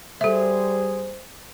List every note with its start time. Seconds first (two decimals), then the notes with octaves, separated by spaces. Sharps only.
0.21 G3 G#4 A4 C5 E5